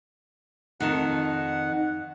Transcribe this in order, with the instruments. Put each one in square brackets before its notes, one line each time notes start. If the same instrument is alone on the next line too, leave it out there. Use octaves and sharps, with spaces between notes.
[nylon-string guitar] F2 D#3 A5 [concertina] F#5